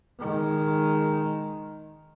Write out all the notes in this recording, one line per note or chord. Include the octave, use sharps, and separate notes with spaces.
D#3 G#3